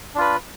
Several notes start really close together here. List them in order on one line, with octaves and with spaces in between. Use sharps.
D4 F4 B4